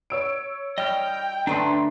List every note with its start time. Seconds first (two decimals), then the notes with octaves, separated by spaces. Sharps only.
0.10 C#5 E6 D7
0.78 G3 D#5 G5 F6
1.47 D3 A3 C#4 D4 B4 A#5 C6